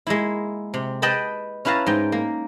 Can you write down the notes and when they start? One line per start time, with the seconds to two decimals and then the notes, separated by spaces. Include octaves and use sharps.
0.07 G#3 A#3 E4
0.74 C3
1.02 B4 D#5 G5 A5 B5
1.65 C#4 E4 B4 F5 A5 A#5
1.86 G#2 D#4 G5
2.12 A#3